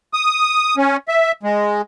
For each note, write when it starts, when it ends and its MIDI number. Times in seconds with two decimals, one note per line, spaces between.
0.14 0.76 87
0.77 0.97 61
1.08 1.32 76
1.43 1.82 56